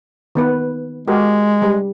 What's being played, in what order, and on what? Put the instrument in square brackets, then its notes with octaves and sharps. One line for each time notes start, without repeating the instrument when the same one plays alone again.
[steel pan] D#3 B3 B4
[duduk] G#3 [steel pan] F#4 G4 A#4
[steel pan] G3